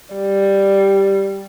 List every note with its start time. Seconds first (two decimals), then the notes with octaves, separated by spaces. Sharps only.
0.15 G3